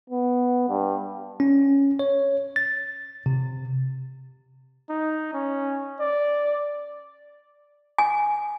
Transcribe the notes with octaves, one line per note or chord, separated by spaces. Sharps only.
B3
G2
C#4
C#5
A6
C3
D#4
C#4
D5
G#5